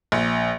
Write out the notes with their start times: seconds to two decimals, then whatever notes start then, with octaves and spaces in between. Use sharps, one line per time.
0.12 A#1